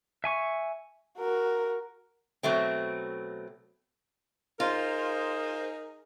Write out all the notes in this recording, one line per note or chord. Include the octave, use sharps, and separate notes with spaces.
E5 G#5 C#6
F#4 A#4
B2 F#3 A3 C4
D#4 F4 G#4 A#4 C5